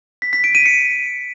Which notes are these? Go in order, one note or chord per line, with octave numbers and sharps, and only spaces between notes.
B6
B6
D7
D#7
C#7